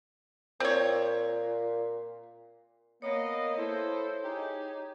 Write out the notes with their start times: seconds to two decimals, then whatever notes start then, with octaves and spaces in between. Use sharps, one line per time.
0.60 A#2 C4 C#5
3.02 A#3 B3 C#5 D#5
3.56 E4 A4 C5
4.24 D#4 G4 G#4